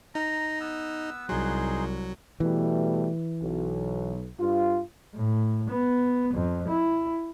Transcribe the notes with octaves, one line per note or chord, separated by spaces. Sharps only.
D#4 A#5
B3 E6
C2 F#3 D#4 G#4 C6
B2 E3 G3 A3
B1
G2 F4
A2
B3
F2
E4